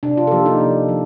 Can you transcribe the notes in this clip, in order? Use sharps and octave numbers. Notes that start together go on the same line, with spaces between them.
C3 D4
F4
A4
F3 A#3 G4
D#4
C3
F3